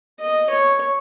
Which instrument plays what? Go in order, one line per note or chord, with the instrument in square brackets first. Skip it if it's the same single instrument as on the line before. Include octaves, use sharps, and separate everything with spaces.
[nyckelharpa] D#5
C#5